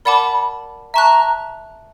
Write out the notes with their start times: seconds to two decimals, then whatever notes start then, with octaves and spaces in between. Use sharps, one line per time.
0.05 A#4 D5 F#5 A5 B5 D6
0.94 E5 A5 A#5 C#6 F#6